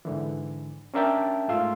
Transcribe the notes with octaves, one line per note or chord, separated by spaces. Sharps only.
G#2 D3 E3
C#4 D4 A#4 E5 G5 A5
G#2 A3 F4 C6 E6